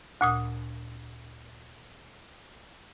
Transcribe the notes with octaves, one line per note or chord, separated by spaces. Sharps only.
D2 A#2 D#6